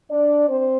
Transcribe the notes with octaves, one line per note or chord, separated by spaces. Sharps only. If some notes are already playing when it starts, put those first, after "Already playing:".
D4 D5
C4 C5